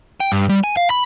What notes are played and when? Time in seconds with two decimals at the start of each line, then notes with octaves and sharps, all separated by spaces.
0.20 G5
0.32 G2
0.49 G3
0.64 G#5
0.77 F5
0.90 B5